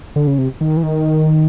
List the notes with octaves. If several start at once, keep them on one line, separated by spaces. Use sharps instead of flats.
D3
C#3
C3
D#3
E3
D#3